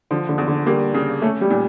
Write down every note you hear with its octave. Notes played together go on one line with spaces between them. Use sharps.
D3 F3
D3
E2
D3
G3 A#3
C#3
A3 C#4
G3
A#2